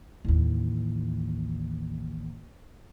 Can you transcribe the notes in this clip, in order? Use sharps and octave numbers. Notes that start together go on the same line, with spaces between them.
A1 D#2